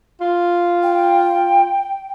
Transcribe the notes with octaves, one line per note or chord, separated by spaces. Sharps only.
F4
G5